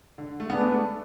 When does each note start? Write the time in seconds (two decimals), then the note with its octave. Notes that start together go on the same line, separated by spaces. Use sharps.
0.18 D3
0.40 A3
0.50 B3 D4 G#4 B4 D5
0.61 A3
0.72 A3